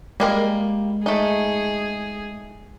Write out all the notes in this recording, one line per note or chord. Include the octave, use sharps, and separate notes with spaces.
G3 G#3 A#3 A#4
A3 D#4 G#4